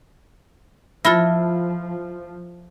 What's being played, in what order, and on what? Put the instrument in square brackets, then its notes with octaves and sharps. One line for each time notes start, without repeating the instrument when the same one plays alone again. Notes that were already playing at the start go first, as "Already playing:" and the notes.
[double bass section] F3 [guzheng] E4 A4 [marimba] F4 B5 A#6